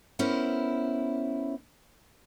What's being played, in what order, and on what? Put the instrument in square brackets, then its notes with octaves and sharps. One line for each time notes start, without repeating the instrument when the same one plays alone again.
[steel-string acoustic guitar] B3 C#4 E4 A#4 C5